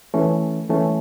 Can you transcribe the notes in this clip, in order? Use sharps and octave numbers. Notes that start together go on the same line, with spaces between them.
E3 A3 C#4
E3 A3 C#4